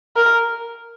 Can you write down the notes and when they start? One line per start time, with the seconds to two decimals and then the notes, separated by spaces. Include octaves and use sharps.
0.16 A#4